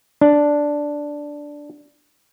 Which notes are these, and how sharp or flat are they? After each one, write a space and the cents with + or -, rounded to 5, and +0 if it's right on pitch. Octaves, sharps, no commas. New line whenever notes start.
D4 -5